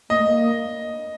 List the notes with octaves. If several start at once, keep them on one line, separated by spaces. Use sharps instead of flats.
A#3 D#5
A3
A#3